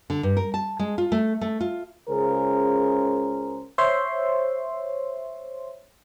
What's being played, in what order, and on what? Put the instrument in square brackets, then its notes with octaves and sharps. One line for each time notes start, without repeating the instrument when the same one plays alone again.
[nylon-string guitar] D3
G2
A#4
A5
G#3
F4
A3
A3
F4
[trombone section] C#2 C#3 G#4 A#4 C5
[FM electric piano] C5 C#5 E5 C6